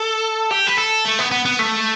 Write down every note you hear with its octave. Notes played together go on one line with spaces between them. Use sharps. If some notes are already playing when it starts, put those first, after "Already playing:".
Already playing: A4
G4
B4
A4
A3
B3
B3
B3
A3